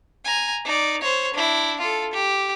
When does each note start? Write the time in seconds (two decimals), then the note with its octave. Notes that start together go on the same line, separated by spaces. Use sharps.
0.25 G#5 A#5
0.65 D#4 D5
1.01 C5 C#5
1.34 D4 E4
1.80 F4 A4
2.13 G4